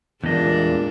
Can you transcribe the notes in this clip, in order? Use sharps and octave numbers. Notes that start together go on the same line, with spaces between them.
E2 G2 A#2 G#3 D4 D#5